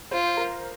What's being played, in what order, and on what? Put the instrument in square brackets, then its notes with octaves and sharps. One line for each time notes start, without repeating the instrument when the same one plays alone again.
[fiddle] F4 [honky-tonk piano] C5
[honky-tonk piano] A#4